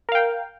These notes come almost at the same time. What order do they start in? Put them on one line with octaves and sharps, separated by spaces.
A#4 F5 G5